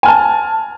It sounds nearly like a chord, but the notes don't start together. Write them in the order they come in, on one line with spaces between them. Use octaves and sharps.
G#5 F6 A5